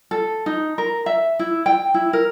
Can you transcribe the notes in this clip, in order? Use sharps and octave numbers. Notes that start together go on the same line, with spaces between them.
A4
D#4
A#4
E5
E4
G5
E4
A#4